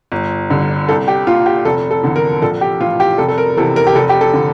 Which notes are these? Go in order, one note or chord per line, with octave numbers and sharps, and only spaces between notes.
G1
G2 D3
C2 A4
G4
A#2 F4
G4
F1 A4
A4
E2 D3
A#4
A#1 A4
G4
A2 E3 F4
G4
F1 A4
A4
A#4
E2 C3 E3 A4
A#4
G4
F1 A4
G4
A4
D3